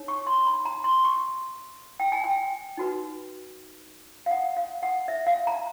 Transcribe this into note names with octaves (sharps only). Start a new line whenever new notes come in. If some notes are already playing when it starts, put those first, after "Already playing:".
Already playing: D#4 G#4 C#5
C#6
C6
B5
A#5
C6
C#6
G5
G#5
G5
D#4 F#4 B4
F5
F#5
F5
F#5
E5
F5
A#5